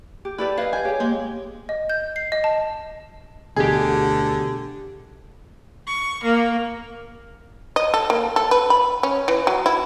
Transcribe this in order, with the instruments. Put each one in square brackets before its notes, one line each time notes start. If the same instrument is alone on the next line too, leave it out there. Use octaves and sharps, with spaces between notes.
[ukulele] G4
[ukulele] E4 G4 [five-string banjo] A4 B4 [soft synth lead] D5
[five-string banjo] E4 [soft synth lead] B4 [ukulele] D#5 F5
[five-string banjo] G#5 [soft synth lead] G6
[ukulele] G4 G#4 [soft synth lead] C#5
[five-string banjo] G#3 [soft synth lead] A#3
[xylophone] D#5
G6
C7
D#5
A5
[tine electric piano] D2 B2 [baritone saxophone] D3 [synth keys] E3 G4 [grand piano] G#4
[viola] C#6
A#3
[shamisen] D#5
A4
A#3
A4
B4
B5
C#4
E3
F#3
E4